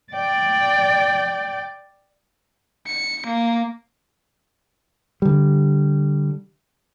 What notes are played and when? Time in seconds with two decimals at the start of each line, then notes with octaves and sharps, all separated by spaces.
0.13 D5 G5
2.87 C#7
3.26 A#3
5.22 D3 G3